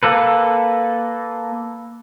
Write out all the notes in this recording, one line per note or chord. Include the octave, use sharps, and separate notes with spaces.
A#3 A4 B4